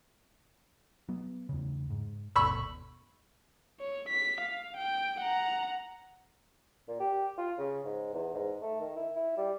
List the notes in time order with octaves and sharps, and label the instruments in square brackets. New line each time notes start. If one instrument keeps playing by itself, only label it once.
[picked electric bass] F#3 B3
E2 C#3
G#2
[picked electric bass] G1 D#2 B2 [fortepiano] B5 C#6 E6
[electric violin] C#5
B6
F5
G5
F#5 A#5
[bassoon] A#2
G4
F4
C#3
G#2
E2
G#2
A3
D#3
E4
E4
G3